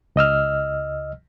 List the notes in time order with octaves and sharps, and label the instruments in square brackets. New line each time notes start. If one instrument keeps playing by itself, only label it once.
[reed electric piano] C#2 D#5 E6 F6